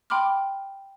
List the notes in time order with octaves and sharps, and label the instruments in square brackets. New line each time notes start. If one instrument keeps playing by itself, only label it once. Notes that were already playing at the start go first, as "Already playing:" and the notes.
[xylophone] G5 B5 C6 D6 F6